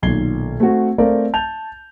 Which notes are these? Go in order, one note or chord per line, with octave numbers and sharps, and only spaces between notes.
B1 A#2 D#3 G#6 C7 G7
A3 C4 F#4
A3 C4 A#4 D5 F5
A5 G6 F7